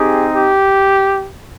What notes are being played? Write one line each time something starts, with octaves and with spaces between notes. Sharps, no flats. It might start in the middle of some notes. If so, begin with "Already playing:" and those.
Already playing: C4 D#4 G4 G#4
G4